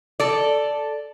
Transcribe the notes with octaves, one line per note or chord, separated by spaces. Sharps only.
A4 D5